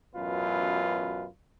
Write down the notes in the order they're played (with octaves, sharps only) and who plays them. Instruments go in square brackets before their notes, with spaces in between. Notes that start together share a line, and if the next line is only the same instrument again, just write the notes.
[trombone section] A1 F#2 B2 F4 B4